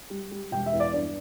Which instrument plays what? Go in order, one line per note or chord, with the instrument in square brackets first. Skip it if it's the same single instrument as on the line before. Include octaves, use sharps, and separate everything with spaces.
[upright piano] G3
G3
E1 G5
E5
E2
D5
G2 D5